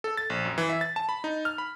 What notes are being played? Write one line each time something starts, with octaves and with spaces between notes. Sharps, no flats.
A4
A6
A#1
F#2
E3
E5
A6
A5
B5
D#4
F6
B5